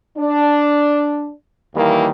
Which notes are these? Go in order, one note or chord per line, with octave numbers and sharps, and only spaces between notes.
D4
D#2 D#3 E3 G3 A#3